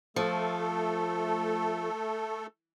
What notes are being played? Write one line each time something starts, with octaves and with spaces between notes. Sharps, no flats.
F3 A3 A4